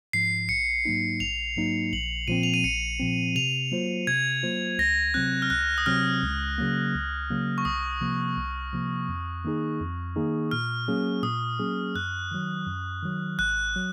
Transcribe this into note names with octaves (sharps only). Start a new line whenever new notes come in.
G#2 F3 C7
A#1 C#7
G#2 F#3 A#3 D#4
A#1 F7
G#2 F#3 A#3 D#4
A#1 F#7
A#2 F3 C4 D#7
F7
D#7
A#1 C#7
A#2 F3 C4
C3 F7
F#3 A#3 F4 C5
C3 G#6
F#3 A#3 F4 C5
C#2 A#6
C3 F#3 C4 F#6
F6
C#2 F#6
D#6
C3 F#3 C4 F6
C#2
C#3 F#3 A#3
C#2
C#3 F#3 A#3
C#6
C2 D#6
C3 F3 A#3
C2
C3 F3 A#3
F2
D#3 A#3 D#4 G#4
F2
D#3 A#3 D#4 G#4
A#2 F6
F#3 A#3 C#4 G#4
A#2 D#6
F#3 A#3 C#4 G#4
F#2 F#6
D#3 F#3
F#2
D#3 F#3
G#1 F#6
F#3